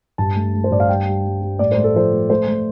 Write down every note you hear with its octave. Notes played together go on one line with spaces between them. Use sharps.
G2 A5
A3
A3
C5
G2 D5
F5
G3 G5
G3
G3
G3
A2 D5
C5
A3
A4
F3 C5
A3
A3 C5
A3